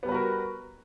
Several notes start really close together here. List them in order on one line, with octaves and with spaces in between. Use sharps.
B3 G3 B4 F#4 A#4